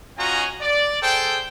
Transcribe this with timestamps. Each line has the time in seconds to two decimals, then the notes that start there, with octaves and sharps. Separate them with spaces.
0.18 C#4 F4 F#4 D#5 G#5 A#5
0.61 D5
1.02 G#4 A4 C5 G5